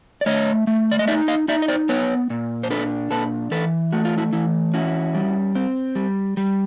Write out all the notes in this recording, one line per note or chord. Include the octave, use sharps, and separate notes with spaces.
D5
A3 C#5 D#5
A3
D5
D#5
D#4 D5 E5
D#5 F5
D#4 D5 E5
D#5
C5 D5
B3 B4 C#5
A#2
C5
D4 A4 B4
A#2 A4 B4
E3 A4 B4
A3 F#4
F4
E4 F#4
E3 E4
C#4 E4 F#4
G3
C4
G3
G3